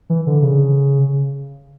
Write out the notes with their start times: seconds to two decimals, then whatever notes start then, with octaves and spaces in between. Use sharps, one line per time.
0.10 E3
0.27 D3
0.42 C#3